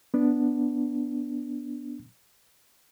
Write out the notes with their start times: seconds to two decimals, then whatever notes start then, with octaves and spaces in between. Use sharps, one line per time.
0.14 B3 D4